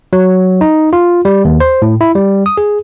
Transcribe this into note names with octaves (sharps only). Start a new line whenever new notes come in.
F#3
D#4
F4
G3
D#2
C5
A2
E4
G3
D#6
G#4